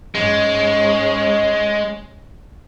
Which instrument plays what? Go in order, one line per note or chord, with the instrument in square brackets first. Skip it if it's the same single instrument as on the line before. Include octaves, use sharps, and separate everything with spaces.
[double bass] G#2 C#4 [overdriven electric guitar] G#3